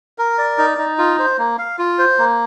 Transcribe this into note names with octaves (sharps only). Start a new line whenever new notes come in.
A#4
D5
D#4
D#4
F4
C5
A#3
F5
F4
C5
A#3